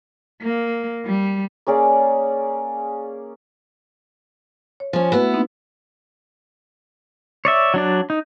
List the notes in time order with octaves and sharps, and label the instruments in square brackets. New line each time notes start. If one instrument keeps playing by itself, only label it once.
[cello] A#3
G3
[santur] A#3 C#4 G#4 D5
[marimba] C#5
[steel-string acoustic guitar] F3 C#4
[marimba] A3 F#4 B4 [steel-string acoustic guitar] B3 E4
[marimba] A#3 C4 D#4
[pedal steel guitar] C#5 D5 E5
F#3 D4 D5
D#4